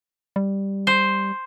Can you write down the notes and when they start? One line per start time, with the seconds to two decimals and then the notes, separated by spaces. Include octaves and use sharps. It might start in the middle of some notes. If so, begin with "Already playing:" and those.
0.36 G3
0.87 C5